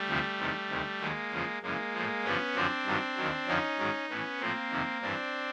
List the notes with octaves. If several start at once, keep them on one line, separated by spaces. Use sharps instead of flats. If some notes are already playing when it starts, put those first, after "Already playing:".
Already playing: G3 A3
D2 C3 F3
E2 C3 D#3
D2 C3 D#3
D#2 D#3 F#3 G#3 A#3
E2 C#3 F3
F#2 C#3 E3 G#3 A#3
A2 F3
G2 D3 F3 B3 C#4
F#2 D3 F3 C4 D4
G2 D#3 F#3
D#2 D#3 F#3
F2 D3 F3 C#4 D#4
G#2 D#3 F#3
A2 E3 B3 C#4
A2 F3 A#3 C4
F2 C3 D#3
G2 E3 C4 D4